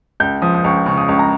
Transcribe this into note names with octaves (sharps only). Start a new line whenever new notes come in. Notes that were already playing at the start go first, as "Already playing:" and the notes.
C#2 G6
F3 D#6
D#6
C#2 C#6
C#3 C#6
D#6
C#2 C#6
A#5